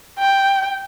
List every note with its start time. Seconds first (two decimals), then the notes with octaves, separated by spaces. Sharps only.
0.19 G5